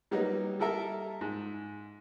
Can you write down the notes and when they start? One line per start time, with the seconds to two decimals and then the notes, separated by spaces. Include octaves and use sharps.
0.11 F#3 G3 A#3 B3 D#4
0.59 G3 E4 A4 A#4 E5
1.21 G#2